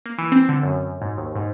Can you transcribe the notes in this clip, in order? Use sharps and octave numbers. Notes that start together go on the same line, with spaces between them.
A#3
E3
C4
D3
F#2
G#2
D#2
G#2